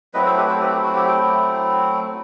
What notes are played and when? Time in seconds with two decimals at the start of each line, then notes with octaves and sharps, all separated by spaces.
0.14 F#3 A3 C4 E4 B4 D#5
0.26 A4 C5
0.37 G4 B4
0.49 A4 C5
0.61 G4 B4
0.72 G4
0.84 F#4
0.96 G4
1.07 G5